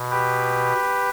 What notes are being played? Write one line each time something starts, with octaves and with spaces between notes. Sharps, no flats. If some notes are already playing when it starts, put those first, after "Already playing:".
Already playing: B2
G4 B4